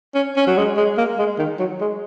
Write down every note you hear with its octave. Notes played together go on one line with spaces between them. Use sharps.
C#4
C#4
F#3
G#3
G#3
A#3
G#3
D#3
F#3
G#3